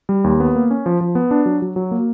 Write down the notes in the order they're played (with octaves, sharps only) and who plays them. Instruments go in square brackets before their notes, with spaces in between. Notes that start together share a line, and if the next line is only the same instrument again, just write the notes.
[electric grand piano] G3
D#2
B3
A#3
C#4
F3
F3
B3
D4
F#3
F#3
F#3
A#3